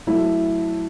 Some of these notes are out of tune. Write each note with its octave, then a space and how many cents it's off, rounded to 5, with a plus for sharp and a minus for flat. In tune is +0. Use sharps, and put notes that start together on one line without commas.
F#3 +0 A3 +0 E4 +0